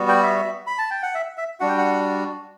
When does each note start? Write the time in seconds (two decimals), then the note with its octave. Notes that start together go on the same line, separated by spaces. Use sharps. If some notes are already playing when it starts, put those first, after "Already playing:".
Already playing: G3 B3 F#4
0.09 G5
0.23 E5
0.67 B5
0.78 A5
0.91 G5
1.03 F#5
1.15 E5
1.38 E5
1.60 G3 D4 F#4 F#5
1.69 G5
1.78 F#5